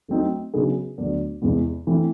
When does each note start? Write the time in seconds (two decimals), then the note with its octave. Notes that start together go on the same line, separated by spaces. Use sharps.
0.08 F#3 A3 C4 D#4
0.54 C#3 F#3 B3 D#4 G#4
0.98 D2 D3 F#3 B3 D4
1.42 E2 C3 E3 G#3 B3
1.87 E3 A3 C4